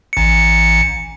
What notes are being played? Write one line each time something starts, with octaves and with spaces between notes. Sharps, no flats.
A1 C#7